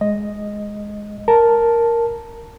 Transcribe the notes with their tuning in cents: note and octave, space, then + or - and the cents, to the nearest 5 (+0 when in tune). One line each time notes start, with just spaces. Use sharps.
G#3 +0 D#5 +0
A#4 +0 A5 +0